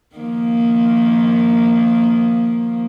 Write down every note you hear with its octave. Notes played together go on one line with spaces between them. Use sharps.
D#3 F3 A#3